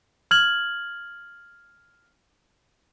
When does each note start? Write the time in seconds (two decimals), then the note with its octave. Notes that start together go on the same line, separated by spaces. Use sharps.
0.31 F6 G#6 F#7